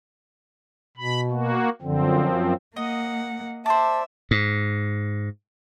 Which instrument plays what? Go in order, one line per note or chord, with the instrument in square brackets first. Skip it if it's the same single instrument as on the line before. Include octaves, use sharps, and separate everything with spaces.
[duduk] B2 [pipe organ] B5
[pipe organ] A#3 F#4
[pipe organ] F#2 F3 C4 [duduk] D3
[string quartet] A#3 F#5 [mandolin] D#5
[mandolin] C5 D5 [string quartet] E5 [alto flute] A5
[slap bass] G#2